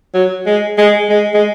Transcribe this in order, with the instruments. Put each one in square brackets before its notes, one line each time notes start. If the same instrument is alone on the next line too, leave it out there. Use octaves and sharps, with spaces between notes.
[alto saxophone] F#3
G#3
G#3
G#3
G#3